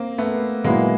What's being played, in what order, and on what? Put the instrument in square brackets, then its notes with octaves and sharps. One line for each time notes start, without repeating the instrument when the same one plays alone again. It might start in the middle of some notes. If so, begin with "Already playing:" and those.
Already playing: [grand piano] A#3 C4
A3 B3
[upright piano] A#2 F#3 B3 E4 [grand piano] G#3 A#3